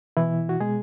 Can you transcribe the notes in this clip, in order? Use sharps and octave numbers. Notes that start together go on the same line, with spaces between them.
B2 E3 E4
F#4
B2 G#3 G#4